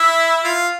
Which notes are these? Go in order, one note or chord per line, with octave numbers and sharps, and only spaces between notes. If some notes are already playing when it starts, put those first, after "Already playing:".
Already playing: E4 E5
F4 F5